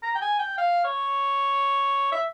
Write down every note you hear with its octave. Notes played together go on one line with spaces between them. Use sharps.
A#5
G5
G#5
G5
F5
C#5
E5